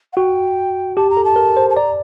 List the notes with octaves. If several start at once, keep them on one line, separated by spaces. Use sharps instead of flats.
F#5
F#4 G5
G4 A5
A#5
A4
A5
A#4
C5
A5
D5 A#5